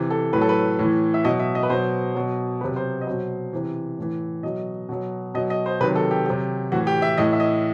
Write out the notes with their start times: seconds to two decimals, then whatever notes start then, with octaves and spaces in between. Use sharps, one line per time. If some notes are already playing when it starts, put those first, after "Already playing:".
Already playing: C3 E3
0.11 A4
0.33 A2 F#3 B4
0.42 A4
0.49 B4
0.79 A2 E3
1.14 E5
1.25 B2 F#3 D#5
1.39 E5
1.55 D#5
1.63 B4
1.69 B2 F#3 C5
2.15 B2 F#3
2.61 C3 F#3 B4
2.76 C5
3.01 D#5
3.06 B2 F#3 C5
3.53 C3 E3
3.99 A2 E3
4.43 B2 F#3 D#5
4.89 B2 F#3
5.34 B2 F#3 D#5
5.50 D#5
5.66 C5
5.81 C3 D#3 F#3 B4
5.96 A4
6.11 G4
6.26 C3 F#3 G4
6.72 A2 E3 F#4
6.87 G4
7.02 E5
7.18 A2 E3 D#5
7.33 E5
7.40 D#5